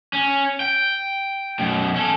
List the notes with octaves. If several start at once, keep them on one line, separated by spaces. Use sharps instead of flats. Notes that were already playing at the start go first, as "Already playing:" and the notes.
C#4
G5
F#2 B2
C#4 A4